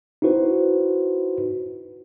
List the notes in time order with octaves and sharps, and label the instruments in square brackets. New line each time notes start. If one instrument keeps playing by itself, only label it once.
[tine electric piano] D#4 E4 F#4 B4 C5